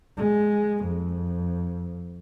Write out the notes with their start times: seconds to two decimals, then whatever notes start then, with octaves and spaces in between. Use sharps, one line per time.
0.17 G#3
0.84 F2